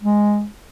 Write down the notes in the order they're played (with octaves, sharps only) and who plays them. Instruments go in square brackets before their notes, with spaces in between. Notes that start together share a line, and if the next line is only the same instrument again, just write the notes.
[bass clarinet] G#3